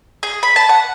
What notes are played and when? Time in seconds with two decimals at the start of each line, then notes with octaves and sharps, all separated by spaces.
0.23 G#4
0.43 B5
0.56 A5
0.69 F#5